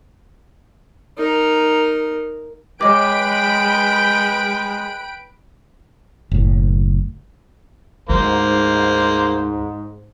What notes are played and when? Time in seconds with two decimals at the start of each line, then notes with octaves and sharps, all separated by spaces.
1.18 D#4 A#4
2.81 G#3 B4 C#5 D#5 G5 B5 D6 D7
6.32 F#1 A2
8.10 D2 G#2 A#3 C5